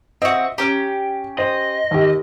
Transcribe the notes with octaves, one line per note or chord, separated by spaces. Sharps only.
C4 F#4 D#5 E5
C#4 G4 A#5
C5 D#5
D#2 G4